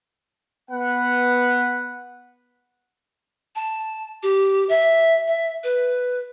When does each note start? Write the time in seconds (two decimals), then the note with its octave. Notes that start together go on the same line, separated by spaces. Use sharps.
0.71 B3 B4 F#5
3.55 A5
4.23 G4
4.69 E5
5.28 E5
5.64 B4